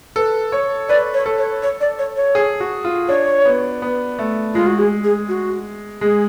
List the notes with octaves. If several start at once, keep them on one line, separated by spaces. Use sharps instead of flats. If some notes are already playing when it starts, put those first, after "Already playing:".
A4 B4
C#5
B4 D5
C#5
A4
C#5
C#5
D5
C#5
C#5
G#4
F#4
F4
D4 C#5
B3
B3
A3
G#3 F4
F#4
G#4
G#4
F#4
G#3 G#4